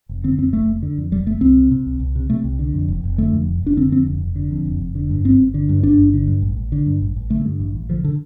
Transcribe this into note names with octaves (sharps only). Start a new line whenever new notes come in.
F1
D3 C4
F2 C4
F1 A3
F1
D3
F2
F1 G3
F1 A3
C2 C4
C3
C3
C2
C2
C3
C3 A3
C2
D3
F2
F1
F1
D3 A3
F2
F1
F1 D4
D3 C4
F2 C4
F1
F1
D3
F2
F1
F1
D3
G2
G1 C4
G1
D3
G2
G1 D4
G1
D3
G2
A1
A1
D3
G2
A1
A1
D3 A3
G2
A1
A1
D3 F3
D3